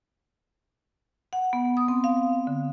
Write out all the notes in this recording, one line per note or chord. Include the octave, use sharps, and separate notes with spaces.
F#5
B3
D#6
C4
F5
D3